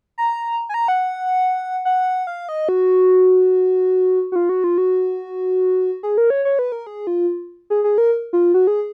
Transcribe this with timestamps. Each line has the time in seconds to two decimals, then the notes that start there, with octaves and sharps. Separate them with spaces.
0.18 A#5
0.69 G#5
0.74 A#5
0.88 F#5
1.85 F#5
2.27 F5
2.49 D#5
2.69 F#4
4.32 F#4
4.36 F4
4.49 F#4
4.64 F4
4.78 F#4
6.03 G#4
6.18 A#4
6.30 C#5
6.45 C#5
6.59 B4
6.72 A#4
6.87 G#4
7.07 F4
7.70 G#4
7.84 G#4
7.98 A#4
8.33 F4
8.54 F#4
8.67 G#4